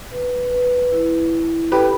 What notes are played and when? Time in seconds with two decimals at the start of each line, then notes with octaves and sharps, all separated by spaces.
0.12 B4
0.51 B4
0.92 E4
1.32 E4
1.72 G4 A4 B4